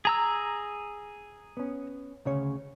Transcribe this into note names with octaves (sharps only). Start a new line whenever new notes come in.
G#4 A#5 E6
B3 C#4
D2 C#3 C#5